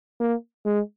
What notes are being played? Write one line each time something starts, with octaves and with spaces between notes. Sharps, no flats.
A#3
G#3